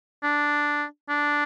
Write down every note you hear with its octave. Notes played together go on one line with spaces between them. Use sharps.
D4
D4